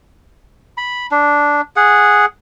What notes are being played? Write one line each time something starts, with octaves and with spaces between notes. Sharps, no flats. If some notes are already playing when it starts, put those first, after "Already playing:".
B5
D4
G#4 F#5